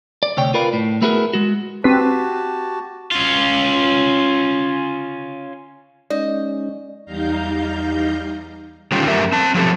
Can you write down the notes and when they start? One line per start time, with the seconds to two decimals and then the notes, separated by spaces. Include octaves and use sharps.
0.23 D5
0.37 D2 C3 C#5 G5
0.54 F4 A#4 B4 D5 F5
0.73 A2
1.02 A3 B3 E4 F#4 G#4 A#4
1.33 G#3 F#4
1.84 C4 F#4 G4 B4 A5
3.11 C#4 F4
6.10 G#3 C#4 D#4 D5 D#5
7.05 E2 G3 D#4 F5 A#5 G6
8.92 D3 D#3 G3 C#4 F4 G4
9.06 F#2 A3 G4 A#4 E5
9.32 C4 A5
9.54 F3 F#3 G4 A4